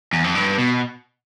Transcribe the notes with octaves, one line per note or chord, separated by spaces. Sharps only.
E2
F2
G2
B2